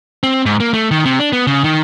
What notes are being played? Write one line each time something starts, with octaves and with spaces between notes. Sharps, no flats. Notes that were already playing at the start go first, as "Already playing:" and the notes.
C4
G#2
A#3
A3
D#3
C3
D4
B3
C#3
D#3